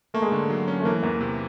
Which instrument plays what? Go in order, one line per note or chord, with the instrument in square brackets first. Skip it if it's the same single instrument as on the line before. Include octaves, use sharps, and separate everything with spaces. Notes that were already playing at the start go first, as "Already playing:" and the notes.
[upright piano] A3 [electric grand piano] A#3
[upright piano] G#3
[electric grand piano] D3 [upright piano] A3
[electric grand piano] F#3
C#4
[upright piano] A3
[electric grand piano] E3 [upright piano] A#3
[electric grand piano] E2 [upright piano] A#3
[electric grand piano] C3